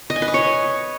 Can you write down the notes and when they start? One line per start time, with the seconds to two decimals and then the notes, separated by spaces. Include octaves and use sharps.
0.10 D#5
0.16 G#5
0.22 B4
0.28 D#5
0.34 C#5